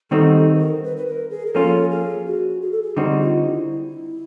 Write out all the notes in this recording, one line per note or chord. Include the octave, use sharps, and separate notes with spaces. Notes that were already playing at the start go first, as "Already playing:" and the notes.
D#3 G3 C4 D#4 F#4 A4
A4
B4
A#4
B4
B4
A#4
G#4
A#4
F3 A#3 C#4 F4 A4
G#4
F#4
G#4
A4
G#4
D3 G3 C4 D#4 F#4 G4
F4
E4